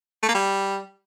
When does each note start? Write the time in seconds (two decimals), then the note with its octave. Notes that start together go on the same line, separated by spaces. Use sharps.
0.23 A3
0.28 A#3
0.34 G3